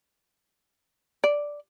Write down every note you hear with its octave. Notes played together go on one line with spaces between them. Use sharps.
D5